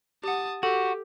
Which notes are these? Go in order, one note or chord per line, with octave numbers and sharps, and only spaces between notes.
G4 F#5 A5 D#6
F#4 G4 A4